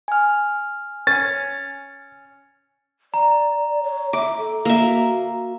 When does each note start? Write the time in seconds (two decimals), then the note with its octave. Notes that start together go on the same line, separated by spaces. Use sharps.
0.08 G#5 F6
1.07 C#4 A6
3.14 D5 A#5
3.83 C#5
4.13 E5 D6
4.39 A4
4.65 A#3 E5
4.79 F#4